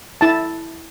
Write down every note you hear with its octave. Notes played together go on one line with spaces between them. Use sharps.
E4 A5